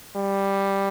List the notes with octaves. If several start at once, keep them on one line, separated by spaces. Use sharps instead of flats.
G3